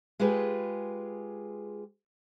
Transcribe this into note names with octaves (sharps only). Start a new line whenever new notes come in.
G#3 F4 G4 G#4 B4